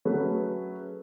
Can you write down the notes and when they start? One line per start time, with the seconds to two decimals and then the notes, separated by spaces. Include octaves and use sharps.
0.05 F#3 A3 C#4 G#4 B4